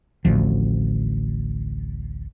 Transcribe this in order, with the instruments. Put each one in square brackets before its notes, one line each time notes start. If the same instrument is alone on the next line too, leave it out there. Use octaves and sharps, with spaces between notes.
[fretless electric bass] D1 A1 D2 F3